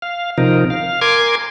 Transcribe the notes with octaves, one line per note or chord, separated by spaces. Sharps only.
F5
C3 F3 D#4 A#4
F5
A#4 G#5 C6 D6 G#6